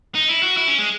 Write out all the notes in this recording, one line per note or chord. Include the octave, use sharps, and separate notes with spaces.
D#4
E4
F#4
E4
C#4
G#3